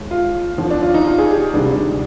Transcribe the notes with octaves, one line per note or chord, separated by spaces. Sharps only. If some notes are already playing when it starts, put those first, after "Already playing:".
Already playing: D#2 D#3 G#3
F4
D#2 D3 F3
D4
F4
D#4
F4
G#4
G4
D2 C3 D#3 G3 D4